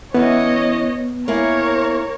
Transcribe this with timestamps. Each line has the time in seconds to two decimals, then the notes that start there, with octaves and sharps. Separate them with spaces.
0.14 E3 B3 C#4 C#5 D#5
1.28 A#3 E4 A#4 C#5 G#5